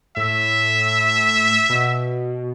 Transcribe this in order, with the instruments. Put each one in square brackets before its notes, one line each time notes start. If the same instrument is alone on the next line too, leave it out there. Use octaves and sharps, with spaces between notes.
[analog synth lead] A2 [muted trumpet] E5
[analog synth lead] B2